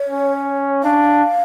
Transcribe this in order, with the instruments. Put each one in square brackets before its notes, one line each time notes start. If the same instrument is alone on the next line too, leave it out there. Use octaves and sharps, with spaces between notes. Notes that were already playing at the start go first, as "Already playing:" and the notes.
Already playing: [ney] C#5
[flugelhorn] C#4
[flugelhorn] D4 [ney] F5